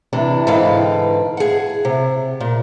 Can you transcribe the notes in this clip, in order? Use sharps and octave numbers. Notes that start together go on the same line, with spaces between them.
C3 E3 D4
G#2 D3 E3 B4 F5 G5
G#4 F#5
C3
A#2